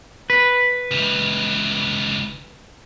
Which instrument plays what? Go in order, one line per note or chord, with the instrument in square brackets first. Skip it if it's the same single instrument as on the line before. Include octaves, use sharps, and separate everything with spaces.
[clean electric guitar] B4
[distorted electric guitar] C#2 E3